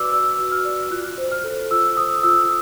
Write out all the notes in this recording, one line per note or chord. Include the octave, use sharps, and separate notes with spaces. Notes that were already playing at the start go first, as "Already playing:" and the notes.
Already playing: F#4 B4 D5 D6 E6
D5 E6
F#4
F6
D5
F4 F#6
C5
F6
A4
F4 E6
C5 D#6
F4 E6